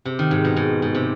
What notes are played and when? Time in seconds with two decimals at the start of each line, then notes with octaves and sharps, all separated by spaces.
0.05 C3
0.19 D#3
0.31 G#2
0.44 B2
0.56 G#2
0.82 G#2
0.95 C3